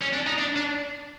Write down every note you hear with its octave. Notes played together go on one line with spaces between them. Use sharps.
C#4
D4
D#4
D4
D4